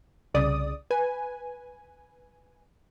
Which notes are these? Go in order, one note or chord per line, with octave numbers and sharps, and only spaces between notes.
C2 C#3 D5 D#6
B4 G#5